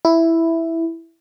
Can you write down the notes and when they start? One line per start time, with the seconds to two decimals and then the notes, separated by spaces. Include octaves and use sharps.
0.05 E4